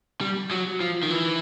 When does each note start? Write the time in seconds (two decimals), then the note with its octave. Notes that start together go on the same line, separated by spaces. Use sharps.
0.21 G3
0.51 F#3
0.81 F3
1.03 D#3
1.10 E3